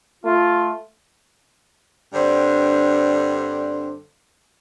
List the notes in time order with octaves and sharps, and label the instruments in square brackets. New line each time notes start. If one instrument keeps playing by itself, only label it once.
[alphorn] A3 [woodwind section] F4
[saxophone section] G2 D3 C4 D4 C5